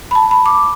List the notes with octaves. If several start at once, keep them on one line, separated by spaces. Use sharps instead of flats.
B5
A5
B5
D6